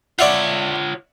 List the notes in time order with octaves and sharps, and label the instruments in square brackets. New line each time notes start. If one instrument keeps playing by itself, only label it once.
[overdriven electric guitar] F4 C#5 [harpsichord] D5 E5 F#5